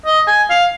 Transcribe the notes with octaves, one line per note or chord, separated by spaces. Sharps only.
D#5
G#5
F5